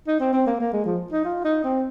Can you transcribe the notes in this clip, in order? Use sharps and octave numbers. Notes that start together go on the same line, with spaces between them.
D#4
C4
C4
A#3
A#3
G#3
F3
D#4
F4
D#4
C4